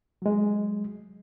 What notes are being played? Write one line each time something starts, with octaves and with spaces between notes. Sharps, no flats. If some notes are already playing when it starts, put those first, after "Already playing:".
F#3 G#3